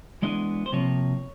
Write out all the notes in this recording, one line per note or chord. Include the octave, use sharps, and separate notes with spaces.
E3 G#3 B3 D4 D#5
C5
C3 F3 A#3 C#5